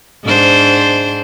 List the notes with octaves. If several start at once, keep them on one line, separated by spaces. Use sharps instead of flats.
G#2 D4 C5